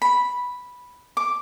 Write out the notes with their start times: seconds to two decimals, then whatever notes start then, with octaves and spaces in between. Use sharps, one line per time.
0.02 B5
1.17 D6